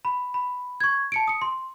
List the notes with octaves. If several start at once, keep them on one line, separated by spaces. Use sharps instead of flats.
B5
B5
C#6 G#6
A5 C#7 D7
D#6 C#7
C6